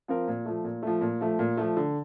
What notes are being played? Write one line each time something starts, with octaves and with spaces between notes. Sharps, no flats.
F3 C4 F4 A#4
A#2
F3 A3
A#2
F3 A3
A#2
F3 A3
A#2
F3 A3
D3